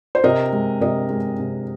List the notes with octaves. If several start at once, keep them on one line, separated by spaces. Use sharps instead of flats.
C5
C3 A#4 D#5
G#3
C3 A#4 D#5
G#3
C3